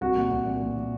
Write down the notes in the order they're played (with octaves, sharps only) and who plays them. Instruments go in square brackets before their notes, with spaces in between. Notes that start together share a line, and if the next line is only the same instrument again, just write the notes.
[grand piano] C2 F#4
A#2
C2
A#2
A#2
A#2